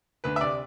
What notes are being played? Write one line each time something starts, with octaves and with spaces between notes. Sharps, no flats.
D2 B4
E5
C3 D5